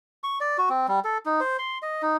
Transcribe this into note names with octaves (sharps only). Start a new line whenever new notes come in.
C#6
D5
F#4
C4
G3
A4
D#4
C5
C6
D#5
D#4